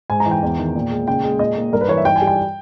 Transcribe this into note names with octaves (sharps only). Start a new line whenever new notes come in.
G#2 G#5
A#5
E3
G5
E2
D#3
A#2
G#3
C#3 G5
G#3
A#2 D#5
A#3
G2 A#4
B4
E3 C#5
E5
G2 G5
G#5
G3
G5